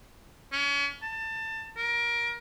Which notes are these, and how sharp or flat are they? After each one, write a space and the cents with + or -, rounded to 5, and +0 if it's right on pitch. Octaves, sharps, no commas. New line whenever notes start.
C#4 +35
A5 +25
A#4 +20